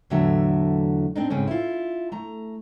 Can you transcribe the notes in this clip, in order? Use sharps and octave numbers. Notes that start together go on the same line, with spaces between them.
E2 A2 D3 F#3 E5
C4 D4 D#4
G#2 C#3 C4 C#4
E4 F4
A3 A#5